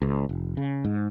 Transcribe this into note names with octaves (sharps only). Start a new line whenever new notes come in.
C#2
F1
C#3
G#2